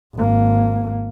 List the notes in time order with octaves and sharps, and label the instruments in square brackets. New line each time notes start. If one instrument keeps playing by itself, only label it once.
[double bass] G#1 A#3